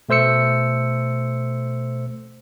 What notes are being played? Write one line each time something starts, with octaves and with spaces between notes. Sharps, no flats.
B2 A3 C5 E6 C#7